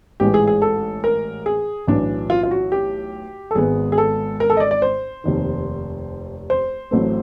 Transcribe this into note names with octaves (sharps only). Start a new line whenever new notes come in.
A1 G#2 E3 G#3 G4
G#4
G#4
A4
A#4
G#4
B1 A2 E3 D4
F4
F4
F#4
G4
A4
G#1 G#2 D#3 G#3 B3 G#4
G#4
A4
A#4
A4
D#5
D5
D5
C5
F1 D#2 D#3
C5
A1 A2 F#3 A3 C4